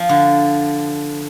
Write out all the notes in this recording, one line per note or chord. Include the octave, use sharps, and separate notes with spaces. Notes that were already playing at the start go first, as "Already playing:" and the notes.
Already playing: F3
D3